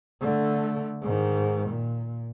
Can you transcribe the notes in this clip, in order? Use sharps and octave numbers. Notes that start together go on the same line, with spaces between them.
D3 A3
G#2 D#3
A#2